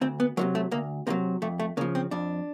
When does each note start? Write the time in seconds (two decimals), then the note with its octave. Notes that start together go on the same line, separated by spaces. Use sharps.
0.01 D2 C4
0.20 B3
0.37 C3 D#3 F#3 A#3
0.55 A3
0.71 D2 A#3
1.07 C3 D#3 F#3 A#3
1.42 F2 A3
1.59 A3
1.77 C#3 F3 A#3
1.95 C4
2.11 F2 D4